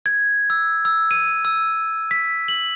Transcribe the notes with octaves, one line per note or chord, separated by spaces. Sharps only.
G#6
E6
E6
D#7
E6
B6
F#7